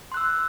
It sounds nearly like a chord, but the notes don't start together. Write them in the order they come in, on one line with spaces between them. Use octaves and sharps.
C6 F#6 E6